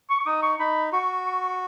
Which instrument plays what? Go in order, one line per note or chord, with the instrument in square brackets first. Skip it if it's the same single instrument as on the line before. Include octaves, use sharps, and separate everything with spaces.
[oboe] C#6
C#6
[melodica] D#4 [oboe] D#6
[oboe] C#6
[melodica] D#4 [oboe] B5
[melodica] F#4 [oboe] C#6
[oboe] C#6